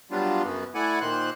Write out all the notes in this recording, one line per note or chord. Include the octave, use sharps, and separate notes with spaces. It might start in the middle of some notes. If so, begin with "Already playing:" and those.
F#3 G3 B3 D4 F4
F#2 C#3 B3
A3 E4 D5 F#5 G#5
A#2 D#3 C5 F#6